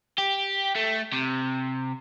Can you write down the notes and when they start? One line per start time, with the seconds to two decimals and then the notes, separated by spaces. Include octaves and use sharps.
0.18 G4
0.76 A3
1.13 C3